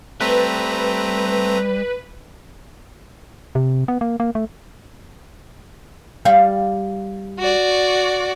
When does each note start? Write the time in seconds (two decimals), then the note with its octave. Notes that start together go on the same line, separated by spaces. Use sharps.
0.20 G3 A3 C4 B4 A#5
3.55 C3
3.88 B3
4.01 A#3
4.20 A#3
4.35 A3
6.25 G3 F5
7.39 F#4 D5